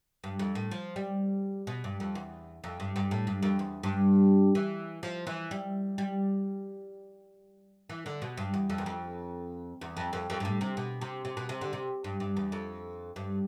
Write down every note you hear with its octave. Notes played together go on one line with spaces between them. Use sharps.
G2
F2
A2
F3
G3
B2
G2
F2
E2
F2
G2
G2
A2
G2
F2
E2
G2
E3
F3
E3
G3
G3
E3
D3
B2
G2
E2
F2
E2
F2
E2
F2
F2
F2
G2
A2
C3
B2
C3
C3
B2
C3
D3
C3
G2
G2
E2
F2
G2